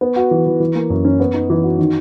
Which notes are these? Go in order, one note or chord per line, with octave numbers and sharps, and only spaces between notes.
B3
F#4
E3
E3
E3
A#3
F#2
C#4
B3
D#4
E3
F#4
D#3